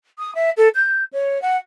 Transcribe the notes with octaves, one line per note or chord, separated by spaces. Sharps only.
D#6
E5
A4
G6
C#5
F#5